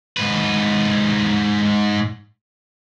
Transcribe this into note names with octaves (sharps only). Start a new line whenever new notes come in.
G#2 B4